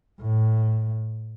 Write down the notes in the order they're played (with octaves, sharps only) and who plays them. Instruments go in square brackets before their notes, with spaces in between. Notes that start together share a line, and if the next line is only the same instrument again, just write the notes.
[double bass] A2